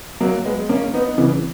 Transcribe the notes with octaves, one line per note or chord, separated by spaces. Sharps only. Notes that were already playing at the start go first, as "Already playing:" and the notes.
F#3 A#3
G#3 B3
A#3 C#4
B3 D#4
C#3 E3